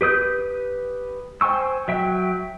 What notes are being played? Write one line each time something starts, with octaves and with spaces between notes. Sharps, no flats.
G4 B4 D#6 G6
C5 G5 G#5 C#6 E6
F#3 E5 G5